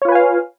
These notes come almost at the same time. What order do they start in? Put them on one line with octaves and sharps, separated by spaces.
C#5 F4 B4 G#5 F5